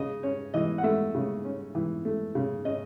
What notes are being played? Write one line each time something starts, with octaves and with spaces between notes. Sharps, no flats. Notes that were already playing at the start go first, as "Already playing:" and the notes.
Already playing: C#3 D#5
C#4 C#5
E3 D#5
F#5
A3 E5
C#3
C#4
E3
A3
C#3
C#4 D#5